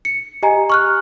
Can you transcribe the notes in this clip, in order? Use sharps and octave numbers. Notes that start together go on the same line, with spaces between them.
C#7
G4 D#5 G#5 A#5
C#6 F6 F#6